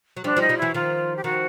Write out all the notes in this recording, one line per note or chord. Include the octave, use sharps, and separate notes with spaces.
F#3
F3 G3 D4
F3 G3
D#4
F3 G3
E3 F#3 E4
D#3 F3 F4
G4
D#3 F3 F#4